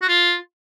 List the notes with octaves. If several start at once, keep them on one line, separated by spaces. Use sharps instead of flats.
F#4
F4